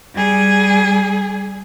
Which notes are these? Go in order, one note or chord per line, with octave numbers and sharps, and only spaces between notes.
G3 G#4